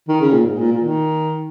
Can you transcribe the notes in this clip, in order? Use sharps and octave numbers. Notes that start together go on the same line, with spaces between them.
D#3
C#3
A#2
G#2
A#2
A#2
D#3